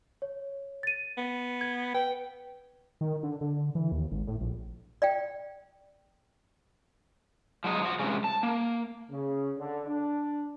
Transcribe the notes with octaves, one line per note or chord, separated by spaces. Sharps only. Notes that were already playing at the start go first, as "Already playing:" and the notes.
C#5
A6 D#7
B3
G#6
B4 G5
D#3
D3
D3
E3
D#2
G#1
A2
A#1
D5 F5 G5
F3 F#3 G#3 D#4
F3 F#4
G2 C3 G#3 C#4 F4
A5
A#3
C#3
D3
D4